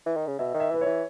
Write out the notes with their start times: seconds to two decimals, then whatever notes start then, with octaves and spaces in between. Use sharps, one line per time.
0.06 E3
0.17 D#3
0.27 C#3
0.39 B2 E5
0.55 D#3
0.60 E5
0.71 E3 B4
0.81 E3 C#5